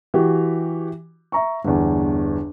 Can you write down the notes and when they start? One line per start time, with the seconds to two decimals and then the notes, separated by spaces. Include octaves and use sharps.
0.14 E3 F#4 G4
1.32 E5 A#5 C#6
1.64 G1 E2